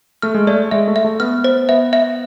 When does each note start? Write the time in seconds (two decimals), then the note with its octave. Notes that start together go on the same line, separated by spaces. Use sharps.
0.22 A3 F6
0.35 G#3
0.47 A3 D5
0.71 G#3 E5
0.88 A3
0.96 E5
1.04 A3
1.20 B3 F6
1.44 C5
1.69 B3 E5
1.93 E5